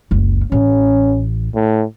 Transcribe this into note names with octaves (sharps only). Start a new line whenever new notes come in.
F#1 C#2
A1 C#4
A2